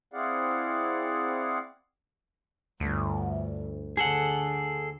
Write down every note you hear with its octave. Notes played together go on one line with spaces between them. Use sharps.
C4 E4 G#4 D5 F5 F#5
G1 D2
D3 G#4 A4 F#5